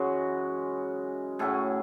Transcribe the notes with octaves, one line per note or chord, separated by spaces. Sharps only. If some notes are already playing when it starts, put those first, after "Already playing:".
Already playing: F#2 E3 G#3 C#4 F#4 G#4
A2 F#3 C#4 E4 G#4